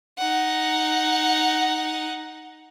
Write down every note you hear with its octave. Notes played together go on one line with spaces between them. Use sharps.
D#4 F#5